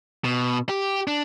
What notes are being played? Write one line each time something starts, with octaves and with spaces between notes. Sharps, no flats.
B2
G4
D4